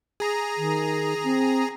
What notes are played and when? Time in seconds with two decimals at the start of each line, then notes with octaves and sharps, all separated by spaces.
0.20 G#4 A#5
0.57 D#3
1.24 C4